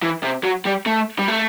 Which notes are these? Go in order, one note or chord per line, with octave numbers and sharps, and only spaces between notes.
E3
C3
F#3
G3
A3
G3
A3